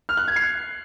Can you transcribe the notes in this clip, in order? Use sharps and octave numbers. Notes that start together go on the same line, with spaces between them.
F6
F#6
G#6
C7